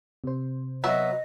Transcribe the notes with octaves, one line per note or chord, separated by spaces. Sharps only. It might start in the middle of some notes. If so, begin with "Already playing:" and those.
C3 C5
F#3 B3 D#5 E5